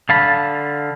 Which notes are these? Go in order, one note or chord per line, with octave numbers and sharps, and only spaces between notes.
D3 F5 A5 B5